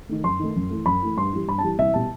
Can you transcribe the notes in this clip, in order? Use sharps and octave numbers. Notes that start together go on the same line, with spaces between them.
D#3 A3
F#2 C6
D#3 A3
F#2
E3 A3
F#2 B5
E3 A3
G2 C6
E3 G3
G2 B5
A5
E3 G3
C2 E5
B2 G3 A5